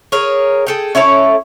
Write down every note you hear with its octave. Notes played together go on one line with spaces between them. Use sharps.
G#4 A#4 C#5
G#4 A4 G5
C#4 E4 A4 C#5